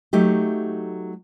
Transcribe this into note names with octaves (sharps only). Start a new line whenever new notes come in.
F#3 A3 D#4 G4